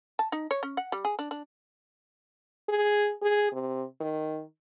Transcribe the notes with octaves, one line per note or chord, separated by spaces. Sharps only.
A5
D#4
C#5
C#4
F#5
G3
G#4
D4
D4
G#4
G#4
C3
D#3